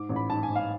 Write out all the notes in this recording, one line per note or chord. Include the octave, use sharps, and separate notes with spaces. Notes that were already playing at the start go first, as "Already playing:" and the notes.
Already playing: G#2 D6
A1
B5
G#2 A5
G#5
G#2
F5